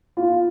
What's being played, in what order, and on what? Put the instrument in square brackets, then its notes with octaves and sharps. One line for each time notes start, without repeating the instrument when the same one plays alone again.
[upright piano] F4